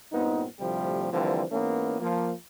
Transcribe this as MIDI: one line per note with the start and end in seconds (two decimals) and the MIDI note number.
0.13 0.45 43
0.13 0.45 46
0.13 0.45 59
0.13 0.45 60
0.13 0.45 63
0.60 1.10 38
0.60 1.10 45
0.60 1.10 48
0.60 1.10 53
0.60 1.10 55
0.60 1.10 67
1.12 1.44 50
1.12 1.44 52
1.12 1.44 53
1.12 1.44 55
1.12 1.44 58
1.12 1.44 60
1.52 1.98 44
1.52 1.98 52
1.52 1.98 58
1.52 1.98 59
1.52 1.98 61
2.00 2.32 53
2.00 2.32 58